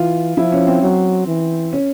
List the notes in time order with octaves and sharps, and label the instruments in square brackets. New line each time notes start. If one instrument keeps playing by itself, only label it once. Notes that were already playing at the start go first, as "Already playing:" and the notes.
Already playing: [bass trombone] E3 [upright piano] F4
[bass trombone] F3 [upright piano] E4
[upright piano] C#4
C4
[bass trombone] F#3
E3
[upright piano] C#4